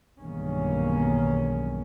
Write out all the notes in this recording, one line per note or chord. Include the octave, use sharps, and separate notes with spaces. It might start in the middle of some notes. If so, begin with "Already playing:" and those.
B1 E2 G2 D#3 A#3 C#4